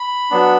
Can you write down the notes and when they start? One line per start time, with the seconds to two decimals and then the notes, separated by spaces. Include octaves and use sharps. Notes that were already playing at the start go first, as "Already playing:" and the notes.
Already playing: B5
0.31 F#3 B3 D4